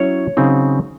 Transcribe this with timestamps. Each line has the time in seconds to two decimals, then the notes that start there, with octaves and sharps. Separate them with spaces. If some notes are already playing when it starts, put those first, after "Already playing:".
Already playing: F#3 C#4 E4 C#5
0.37 C#3 F#3 C4 D#4